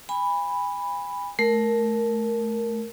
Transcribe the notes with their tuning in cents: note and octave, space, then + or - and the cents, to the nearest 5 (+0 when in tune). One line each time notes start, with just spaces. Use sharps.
G#5 -35 B5 +0
A3 -20 A#4 +0